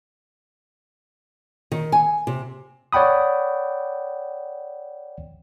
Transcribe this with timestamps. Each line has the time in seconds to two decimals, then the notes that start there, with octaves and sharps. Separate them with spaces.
1.72 D#3
1.92 G#5
2.27 C3
2.93 C#5 D5 F#5 G5 B5 D#6